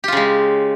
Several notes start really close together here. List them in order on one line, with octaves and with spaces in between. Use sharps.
G4 F4 C#3 G#3